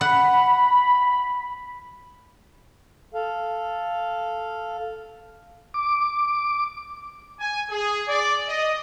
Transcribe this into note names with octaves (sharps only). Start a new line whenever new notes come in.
F#5 B5
A4 F5
D6
G#5
G#4
D5
D#5